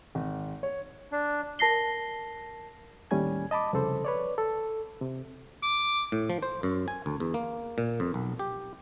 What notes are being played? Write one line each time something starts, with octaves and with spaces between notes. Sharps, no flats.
G#1
C#5
D4
A#4 A5 A#6 C7 G7
D#2 A2 G3 C#4 G#5 G#6
D#5 A5 B5 D6
C2 F2 C#3 A4 C5
B4 C#5 D5
A4
C3
D6
A2
F3
C5
F#2
G#5
D2
E2
A#3
A#2
F2
B1
G4